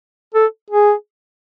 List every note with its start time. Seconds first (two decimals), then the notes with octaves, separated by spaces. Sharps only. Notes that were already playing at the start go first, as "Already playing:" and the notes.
0.35 A4
0.71 G#4